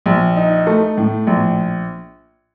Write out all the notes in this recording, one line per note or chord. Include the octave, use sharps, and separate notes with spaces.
A#1
D#4
A3
A2
A#1